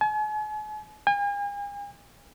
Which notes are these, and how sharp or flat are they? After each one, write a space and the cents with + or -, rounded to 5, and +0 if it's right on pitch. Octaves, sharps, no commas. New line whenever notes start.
G#5 +40
G#5 -45